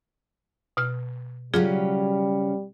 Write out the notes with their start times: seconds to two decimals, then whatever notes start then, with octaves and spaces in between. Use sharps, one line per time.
0.77 B2 F6
1.54 C#3 F#3 G3 C#4 F4 G#4